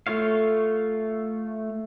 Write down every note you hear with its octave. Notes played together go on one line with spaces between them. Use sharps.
A3 F4 C#5 F5